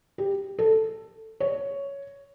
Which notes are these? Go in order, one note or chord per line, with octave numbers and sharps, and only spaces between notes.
G4
A4
C#5